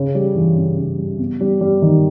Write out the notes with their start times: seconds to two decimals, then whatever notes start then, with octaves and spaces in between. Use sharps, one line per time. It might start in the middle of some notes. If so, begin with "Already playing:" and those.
Already playing: C#3
0.15 G3
0.35 E3
0.57 C#3
0.78 C#3
0.98 G3
1.19 B3
1.41 G3
1.61 G3
1.82 D#3